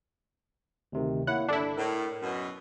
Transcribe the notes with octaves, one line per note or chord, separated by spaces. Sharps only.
D2 C3 D#3
A#3 E4 C#5 F#5
G1 D4 E4 A4
A2 A#4
F#2 B2